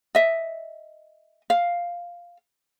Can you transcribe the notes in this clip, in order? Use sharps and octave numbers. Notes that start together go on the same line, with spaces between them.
D#5 E5
F5